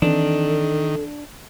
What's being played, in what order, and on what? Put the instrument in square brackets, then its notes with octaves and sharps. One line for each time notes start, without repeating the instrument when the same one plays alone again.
[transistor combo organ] D#3 [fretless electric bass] E3 C4 [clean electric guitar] D4 [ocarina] A4